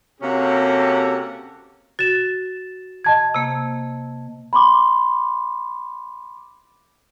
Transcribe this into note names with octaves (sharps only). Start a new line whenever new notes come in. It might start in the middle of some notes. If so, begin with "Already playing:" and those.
C3 A#3 C#4 F#4 G4 A4
F#4 A6 E7
D#5 A5 G#6
C3 A#3
B5 C6 D6